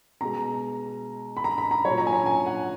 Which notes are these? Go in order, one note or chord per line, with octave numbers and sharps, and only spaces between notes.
B2 G#3 A#5
B5
A#5
B5
A#5
F#3 C#5
A#2
A#5
G#5
A#5
G#5
F#5